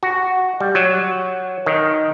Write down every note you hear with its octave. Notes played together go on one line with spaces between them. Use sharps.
F#4
G3
F#3
D#3